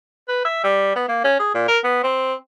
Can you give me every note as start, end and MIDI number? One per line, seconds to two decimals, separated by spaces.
0.28 0.42 71
0.45 0.62 76
0.64 0.95 55
0.96 1.04 59
1.09 1.20 58
1.24 1.36 61
1.39 1.51 68
1.54 1.63 46
1.68 1.78 70
1.84 1.99 59
2.03 2.34 60